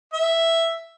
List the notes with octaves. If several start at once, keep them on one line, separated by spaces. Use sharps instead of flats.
E5